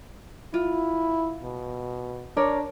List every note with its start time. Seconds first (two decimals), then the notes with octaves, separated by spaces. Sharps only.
0.54 E4 F4
1.43 B2
2.37 D4 A#4 C#5 D5